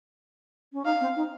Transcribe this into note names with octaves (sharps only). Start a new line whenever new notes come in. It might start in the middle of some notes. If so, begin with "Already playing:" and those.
C#4
D#4 F5
C4
D#4